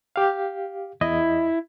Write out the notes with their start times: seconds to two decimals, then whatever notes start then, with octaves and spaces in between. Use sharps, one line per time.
0.16 G4 F5
1.01 E2 E4 D#5